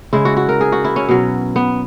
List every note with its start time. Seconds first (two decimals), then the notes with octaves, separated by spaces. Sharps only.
0.13 C#3 G#3 E4
0.25 F#4
0.37 F#4
0.49 A#4
0.61 G#4
0.72 F#4
0.84 E4
0.96 C#4
1.09 B2 F#3
1.56 B3